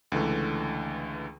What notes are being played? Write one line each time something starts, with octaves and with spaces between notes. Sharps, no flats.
C#2 D3 E3 A3